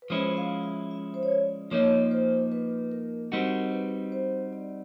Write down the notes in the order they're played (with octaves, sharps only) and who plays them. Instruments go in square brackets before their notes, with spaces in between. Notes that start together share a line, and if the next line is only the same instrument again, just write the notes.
[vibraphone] B4
[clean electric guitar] F3 G#3 C#4 E4 [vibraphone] C5
[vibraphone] F5
E5
E5
C5
C#5
D5
[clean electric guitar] F3 A#3 D#4 [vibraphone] C#5
[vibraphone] C5
B4
A#4
[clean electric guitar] G3 C4 D#4 F#4 [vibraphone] A#4
[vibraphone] B4
C5
D5